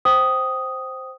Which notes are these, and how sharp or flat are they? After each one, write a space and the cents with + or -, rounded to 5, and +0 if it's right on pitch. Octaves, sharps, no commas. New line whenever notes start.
C5 +0 G5 -20 D#6 +0